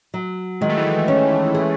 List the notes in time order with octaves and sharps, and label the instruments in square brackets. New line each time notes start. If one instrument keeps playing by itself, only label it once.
[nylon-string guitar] F#3
[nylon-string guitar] D#3 [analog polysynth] G#3
[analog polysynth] A3
E3 G#3
[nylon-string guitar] C#4
G#4